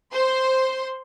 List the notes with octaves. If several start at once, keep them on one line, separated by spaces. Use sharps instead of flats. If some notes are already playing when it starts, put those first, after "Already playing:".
C5 C6